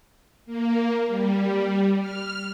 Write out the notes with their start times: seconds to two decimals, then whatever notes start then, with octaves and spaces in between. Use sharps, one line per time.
0.46 A#3
1.07 G3
2.00 F6